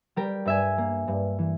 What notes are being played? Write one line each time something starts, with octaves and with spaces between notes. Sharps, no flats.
G3 G4 A#4
G2 E5 G#5
A#3
G2
E3